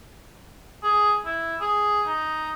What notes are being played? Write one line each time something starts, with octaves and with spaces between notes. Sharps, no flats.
G#4
E4
G#4
D#4